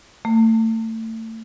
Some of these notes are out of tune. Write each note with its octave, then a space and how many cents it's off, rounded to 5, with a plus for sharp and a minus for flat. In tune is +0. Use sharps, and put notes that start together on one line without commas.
A3 +30